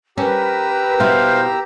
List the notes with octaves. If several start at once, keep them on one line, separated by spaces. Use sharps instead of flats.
C#4 G4 A#4 B4 A#5 E6
B2 B3 E4 C5 F5